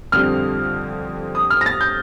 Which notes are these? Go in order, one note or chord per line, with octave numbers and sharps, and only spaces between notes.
F2 D3 G3 C4 F6
D#6
F6
A#6
A6
G6